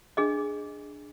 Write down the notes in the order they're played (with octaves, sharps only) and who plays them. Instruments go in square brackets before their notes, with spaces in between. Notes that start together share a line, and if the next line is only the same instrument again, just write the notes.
[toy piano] D4 G#4 D#5